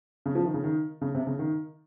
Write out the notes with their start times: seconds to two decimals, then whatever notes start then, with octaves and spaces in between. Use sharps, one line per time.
0.26 C#3
0.35 F3
0.45 D#3
0.54 C#3
0.64 D#3
1.01 C#3
1.14 C3
1.27 C#3
1.39 D#3